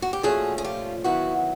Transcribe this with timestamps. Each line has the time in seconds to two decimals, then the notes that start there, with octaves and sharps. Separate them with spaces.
0.02 F#4
0.13 G4
0.23 A#2 F3 A3 C#4 F#4 G#4
0.58 G#4
0.64 F4 G4
1.04 D#3 F#3 B3 E4 F#4